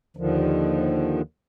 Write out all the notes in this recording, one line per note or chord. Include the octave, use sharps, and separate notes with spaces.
D#2 D3 D#3 F3